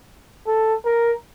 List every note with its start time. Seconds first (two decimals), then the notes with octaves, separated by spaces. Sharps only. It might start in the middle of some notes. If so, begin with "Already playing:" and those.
0.47 A4
0.86 A#4